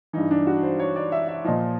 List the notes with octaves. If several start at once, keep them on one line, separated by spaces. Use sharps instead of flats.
G2 E3 D#4
D4
F#4
C5
C#5
D5
E5
E5
A#2 F3 D#5